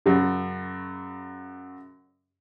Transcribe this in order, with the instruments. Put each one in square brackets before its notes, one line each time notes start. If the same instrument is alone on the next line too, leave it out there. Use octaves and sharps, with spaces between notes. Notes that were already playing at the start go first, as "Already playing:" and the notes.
[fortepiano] F#2 C#3